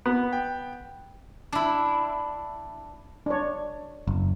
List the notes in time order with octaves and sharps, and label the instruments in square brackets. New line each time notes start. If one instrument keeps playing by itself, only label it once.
[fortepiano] B3
[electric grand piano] G5
[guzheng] D4 E4
[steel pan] D4 C#5
[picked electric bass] F#1